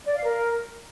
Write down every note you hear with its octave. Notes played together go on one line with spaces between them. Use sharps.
D5
F5
A#4